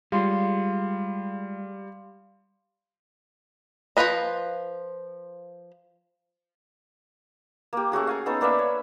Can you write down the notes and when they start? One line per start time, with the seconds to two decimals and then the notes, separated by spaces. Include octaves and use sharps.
0.12 G3 G#3 F4 F5 C6
3.97 F3 E4 F4 B4 D#5
7.73 A#3 G4
7.92 A3 C#4 F#4 G#4
8.07 F5 G#5 A#5
8.26 B3 C#4 D#4 A4
8.41 A#3 D4 B4 E5
8.59 C#5